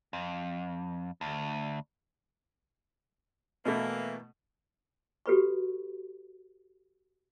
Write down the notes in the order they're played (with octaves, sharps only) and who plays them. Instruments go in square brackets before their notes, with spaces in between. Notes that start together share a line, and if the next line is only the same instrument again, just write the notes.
[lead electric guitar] F2
D2
[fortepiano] B2 A3 [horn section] E3 A#3
[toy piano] F#4 G4 A4 B4 B5 C#6